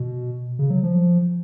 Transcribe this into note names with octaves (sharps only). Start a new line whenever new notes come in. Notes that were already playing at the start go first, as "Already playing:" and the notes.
Already playing: B2
C#3
F#3
F3